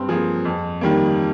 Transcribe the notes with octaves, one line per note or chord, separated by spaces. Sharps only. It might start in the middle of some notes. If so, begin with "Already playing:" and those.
Already playing: G2 C4
F3 A#3 G#4
F2
D#3 G3 A#3